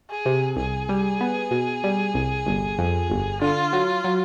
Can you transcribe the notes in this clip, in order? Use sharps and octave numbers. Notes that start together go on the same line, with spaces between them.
G#4
C3
C2 G#4
G3
B3
B2
G3
C2
G1
F2
G1
D3 F4
F#3
F#3